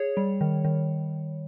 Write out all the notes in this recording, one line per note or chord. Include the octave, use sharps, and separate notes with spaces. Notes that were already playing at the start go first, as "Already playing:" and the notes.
Already playing: G#4 C#5
G3
D#3
D#3